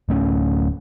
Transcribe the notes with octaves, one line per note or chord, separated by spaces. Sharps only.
D1 A3 C#4